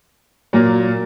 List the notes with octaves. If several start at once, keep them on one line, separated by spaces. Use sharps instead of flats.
A#2 F#3 A#3